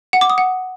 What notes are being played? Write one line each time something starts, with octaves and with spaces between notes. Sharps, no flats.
F#5
D6
D#6
F#5